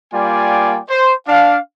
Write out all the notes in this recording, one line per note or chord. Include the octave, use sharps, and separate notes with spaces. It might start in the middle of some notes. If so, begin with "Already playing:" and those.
G3 A#3 F4 D5 G5 G#5
C5
D4 F5